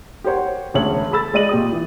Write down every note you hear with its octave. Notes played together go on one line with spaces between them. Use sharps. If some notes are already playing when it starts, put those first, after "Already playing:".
G4 A#4 C5 C#5 F#5
E1 D2 C#3 C#5 F#7
G#4 A4 B5 E6 A6
G#3 D5 D#5 D#7 F#7
A#2 G4 D#6
E3